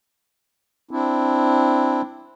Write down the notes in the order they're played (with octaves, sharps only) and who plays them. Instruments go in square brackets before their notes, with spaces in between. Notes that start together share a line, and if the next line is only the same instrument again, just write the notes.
[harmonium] C4 D4 E4